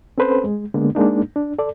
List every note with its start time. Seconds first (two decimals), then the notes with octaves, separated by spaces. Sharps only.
0.18 C4 C#4 A4 B4 C5
0.44 G#3
0.74 D3 G#3 A#3 B3 D4
0.95 G#3 A#3 D4 D#4
1.36 D4
1.59 A4 D5